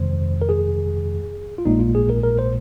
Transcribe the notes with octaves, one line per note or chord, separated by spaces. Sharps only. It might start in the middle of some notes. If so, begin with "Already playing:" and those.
Already playing: F2 C3 D#3 G#3 C5
A#4
G#4
F4
A#1 A#2 G#3 D#4
F4
G#4
A#4
A#4
C5